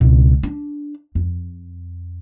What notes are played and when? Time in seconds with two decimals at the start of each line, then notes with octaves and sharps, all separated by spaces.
0.01 C#2 B2
0.43 D4
1.15 F2